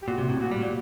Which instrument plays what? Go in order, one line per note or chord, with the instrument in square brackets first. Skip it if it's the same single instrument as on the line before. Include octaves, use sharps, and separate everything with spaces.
[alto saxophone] G4
[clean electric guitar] A#2 [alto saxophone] F#4
[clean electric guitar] C3
A2
[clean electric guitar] A#2 [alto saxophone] F#4
[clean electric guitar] G3
A#2